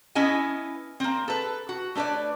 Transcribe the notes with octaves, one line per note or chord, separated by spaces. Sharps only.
B3 C#4 E4 D#5 G#5
A#3 C4
A4 B4
F#4
A3 D4 B4 C#5 D5